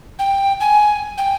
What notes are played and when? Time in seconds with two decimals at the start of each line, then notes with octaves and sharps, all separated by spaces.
0.19 G5
0.60 G#5
1.18 G5